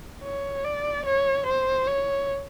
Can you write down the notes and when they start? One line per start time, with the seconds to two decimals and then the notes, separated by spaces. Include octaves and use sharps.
0.24 C#5
0.64 D5
1.06 C#5
1.46 C5
1.87 C#5